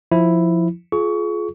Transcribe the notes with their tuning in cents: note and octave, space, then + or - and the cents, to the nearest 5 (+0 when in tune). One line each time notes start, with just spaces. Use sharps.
F3 +0 E4 +0
F4 +0 G#4 +30 C#6 +25